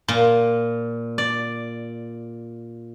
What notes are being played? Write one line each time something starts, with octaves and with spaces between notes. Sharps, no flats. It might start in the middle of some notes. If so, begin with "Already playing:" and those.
A#2
D5